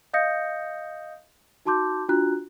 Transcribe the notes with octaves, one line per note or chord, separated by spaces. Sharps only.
D#5 F5 D#6 G6 A#6 C#7
D#4 F#4 A5 C6 D6 G6
D4 F4 F#4 A#5 F#6